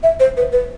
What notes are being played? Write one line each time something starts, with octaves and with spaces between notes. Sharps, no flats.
E5
C5
B4
B4